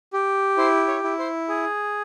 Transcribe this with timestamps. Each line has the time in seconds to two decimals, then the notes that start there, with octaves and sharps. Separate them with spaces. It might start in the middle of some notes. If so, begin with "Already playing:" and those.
0.13 G4
0.57 E4 C5
0.88 C#5
1.04 E4
1.19 C5
1.49 G#4